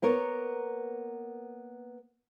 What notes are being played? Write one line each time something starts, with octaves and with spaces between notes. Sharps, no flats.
A#3 B3 A#4 C#5